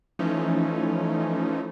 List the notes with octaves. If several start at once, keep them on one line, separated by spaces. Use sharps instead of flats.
E3 F3 A3 C#4 D#4